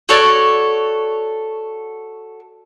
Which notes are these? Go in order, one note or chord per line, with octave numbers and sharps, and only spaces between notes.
F#4 A4 C#5 D5